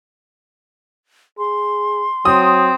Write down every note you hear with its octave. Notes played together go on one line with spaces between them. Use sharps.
G#4 C6
F#3 C4 D#6